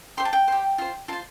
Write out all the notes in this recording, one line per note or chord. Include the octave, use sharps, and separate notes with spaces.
G4 C5 C6
A5
G5
G4 C5
F4 C5
F4 C5 A5